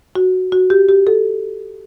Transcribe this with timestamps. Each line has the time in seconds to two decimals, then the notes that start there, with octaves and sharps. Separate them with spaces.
0.16 F#4
0.52 F#4
0.70 G4
0.89 G4
1.07 A4